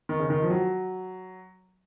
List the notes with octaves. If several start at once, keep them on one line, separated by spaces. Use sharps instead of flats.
D#3
C#3
D#3
F3
F#3